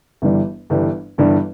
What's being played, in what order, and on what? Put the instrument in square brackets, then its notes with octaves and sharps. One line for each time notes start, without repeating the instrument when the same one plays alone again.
[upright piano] G1 G2 E3 G3
G1 G2 E3 G3
G1 G2 E3 G3